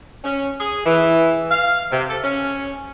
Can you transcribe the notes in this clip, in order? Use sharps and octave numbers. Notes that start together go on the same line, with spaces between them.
C#4
G#4
E3
F5
C3
A4
C#4